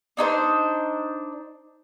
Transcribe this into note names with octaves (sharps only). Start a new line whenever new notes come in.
D4 D#4 B4 C5